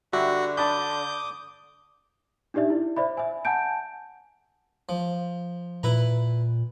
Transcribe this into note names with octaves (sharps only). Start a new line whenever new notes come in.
D3 G3 F#4 E5
D4 A5 B5 D6 D#6 G6
D4 D#4 G4 D5 E5
E4
C5 D5 E5 B5
E5 G#5
F#5 G#5 A5 G6 D7
F3
A#2 E4 B4 A#5